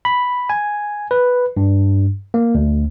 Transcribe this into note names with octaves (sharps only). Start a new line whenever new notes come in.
B5
G#5
B4
G2
A#3
D2